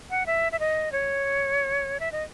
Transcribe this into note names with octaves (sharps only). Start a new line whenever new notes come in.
F#5
E5
E5
D#5
C#5
E5
D#5